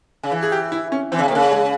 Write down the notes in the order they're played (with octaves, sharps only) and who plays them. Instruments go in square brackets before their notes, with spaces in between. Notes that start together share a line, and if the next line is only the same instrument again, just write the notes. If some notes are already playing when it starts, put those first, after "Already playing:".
[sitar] C#3
E3
[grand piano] G#4
G4
E4
C#4
[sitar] E3 [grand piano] C4
[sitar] C#3
C3
[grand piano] A#3
[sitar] C#3
[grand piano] G#3